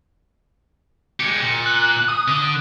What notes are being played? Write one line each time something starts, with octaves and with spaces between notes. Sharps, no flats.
G#3 G4 C#7
A#2
F#6
D#6
D3